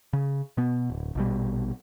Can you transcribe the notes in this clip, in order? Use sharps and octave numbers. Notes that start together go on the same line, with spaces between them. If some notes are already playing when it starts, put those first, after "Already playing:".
C#3
B2 B3
D1
A#1 B2 G3